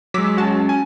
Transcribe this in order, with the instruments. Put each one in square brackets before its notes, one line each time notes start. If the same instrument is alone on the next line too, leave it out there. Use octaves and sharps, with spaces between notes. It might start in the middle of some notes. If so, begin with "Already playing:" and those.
[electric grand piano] F#3 G#3 [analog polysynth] D6 E6 B6
[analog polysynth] C#4 F#4 A5
[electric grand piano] G#5